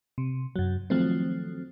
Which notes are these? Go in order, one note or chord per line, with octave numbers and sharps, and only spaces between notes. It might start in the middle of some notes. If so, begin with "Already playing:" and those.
C3
F#2 F#3
D#3 F3 F#3 A3 C4